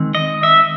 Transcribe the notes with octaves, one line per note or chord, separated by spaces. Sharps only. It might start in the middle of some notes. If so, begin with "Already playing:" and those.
Already playing: D#3 G#3 C4
D#5
E5